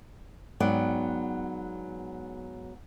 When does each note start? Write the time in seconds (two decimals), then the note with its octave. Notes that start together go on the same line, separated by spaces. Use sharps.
0.60 G#2 F#3 B3 D5 F#5 G5